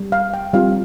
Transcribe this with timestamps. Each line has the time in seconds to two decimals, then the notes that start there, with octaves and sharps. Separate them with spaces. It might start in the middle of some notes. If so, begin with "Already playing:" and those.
Already playing: G3
0.12 F5
0.34 G5
0.53 G3 C4 F4 F5